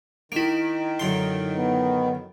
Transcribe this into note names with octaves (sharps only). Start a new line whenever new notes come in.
D#3 A#3 E4 D7
F#2 D3 C6
B3